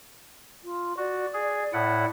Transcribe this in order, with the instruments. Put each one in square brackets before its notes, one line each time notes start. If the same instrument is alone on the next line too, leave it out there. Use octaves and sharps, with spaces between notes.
[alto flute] F4
[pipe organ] F#4 [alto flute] D5
[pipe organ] G#4
A2 E4 F#5